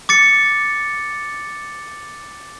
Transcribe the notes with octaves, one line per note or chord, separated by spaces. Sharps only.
D6 A6 C#7